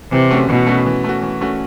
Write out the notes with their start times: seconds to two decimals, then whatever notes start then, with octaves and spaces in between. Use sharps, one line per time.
0.12 C3 E3
0.31 A3 C#4 F#4
0.49 B2 E3
0.67 A3 C#4 F#4
0.86 E3
1.04 A3 C#4 F#4
1.23 E3
1.41 A3 C#4 F#4